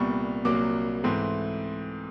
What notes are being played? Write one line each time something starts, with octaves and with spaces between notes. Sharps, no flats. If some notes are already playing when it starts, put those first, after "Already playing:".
Already playing: C2 A#2 G3 B3 C#6
C2 A#2 F#3 A#3 D6
G#2 E3 A3 C4